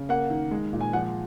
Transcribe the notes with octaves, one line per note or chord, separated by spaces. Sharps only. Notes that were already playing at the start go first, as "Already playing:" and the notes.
Already playing: C#3
A#3 F#5
D#3
G#3
A#2
G#5
F3 F#5